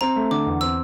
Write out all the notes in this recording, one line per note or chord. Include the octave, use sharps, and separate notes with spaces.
C4 A#5
A3
D3 D6
E2
C4 E6